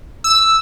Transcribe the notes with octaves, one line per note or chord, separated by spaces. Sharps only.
E6